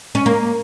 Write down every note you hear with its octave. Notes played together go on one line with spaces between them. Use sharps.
C#4
A#3